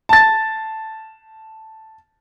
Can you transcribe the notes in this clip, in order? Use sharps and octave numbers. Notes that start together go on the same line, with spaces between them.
A5 A6